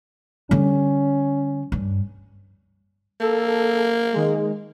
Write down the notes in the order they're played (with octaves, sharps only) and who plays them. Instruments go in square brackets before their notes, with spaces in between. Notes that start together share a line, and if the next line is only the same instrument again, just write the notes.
[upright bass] D3 G3 [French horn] C#4
[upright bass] G2
[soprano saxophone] A#3 [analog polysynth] A4
[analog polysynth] D#3 G#3